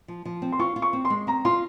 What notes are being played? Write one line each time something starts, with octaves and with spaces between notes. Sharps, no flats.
F3
F3
C4
C6
F4 C#6
F4
C#6
C4
C6
G#3
C4 A#5
F4 C6